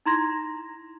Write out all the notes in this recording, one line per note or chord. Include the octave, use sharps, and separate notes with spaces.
D#4 E4 A#5 C6 G#6 A#6